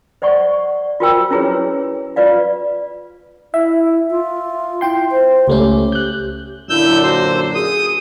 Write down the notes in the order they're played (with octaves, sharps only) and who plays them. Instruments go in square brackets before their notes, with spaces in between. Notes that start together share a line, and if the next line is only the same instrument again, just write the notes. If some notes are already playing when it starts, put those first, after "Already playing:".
[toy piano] C5 D5 F#5 C#6
F4 F#4 A#4 C5 G5 E6
C#4 E4 G#4 B4 C#5
F4 B4 D5 F5
[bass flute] E4 [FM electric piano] E5
[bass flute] F4
[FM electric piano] E4 G5 C6
[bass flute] C5
[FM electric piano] C#2 A3 C#4 [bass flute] G4
[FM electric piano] F#6 G6
[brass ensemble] F#2 A#2 D3 [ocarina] E4 [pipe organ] E6 G6
[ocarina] F#4 [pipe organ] C5
[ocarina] G#4 [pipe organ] D#6